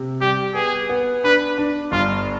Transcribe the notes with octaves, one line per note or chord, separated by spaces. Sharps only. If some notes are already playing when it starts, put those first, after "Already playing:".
Already playing: C3
G3 G4
B3 G#4
B3
D4 B4
D4
G1 F4